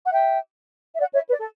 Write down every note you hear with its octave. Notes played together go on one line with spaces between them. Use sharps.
F#5
E5 G5
E5
D5 F#5
C#5 E5
B4 D5
A4